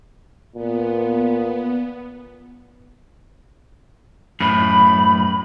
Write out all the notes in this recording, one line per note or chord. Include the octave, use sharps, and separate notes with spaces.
A#2 B3
F#2 A2 B5